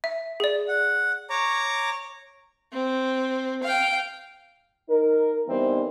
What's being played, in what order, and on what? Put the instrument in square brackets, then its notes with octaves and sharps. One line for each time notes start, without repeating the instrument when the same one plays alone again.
[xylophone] E5
G#4 D5
[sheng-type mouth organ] F#5
C#5 A#5 D6
[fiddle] C4
F5 G5
[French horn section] D#4 A#4
E3 G3 B3 C4 D#4 A#4